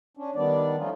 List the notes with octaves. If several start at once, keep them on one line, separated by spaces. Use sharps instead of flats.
C#4 D4
D#3 G3 B3 D4 D5
F3 A3 C#4 D#4 F4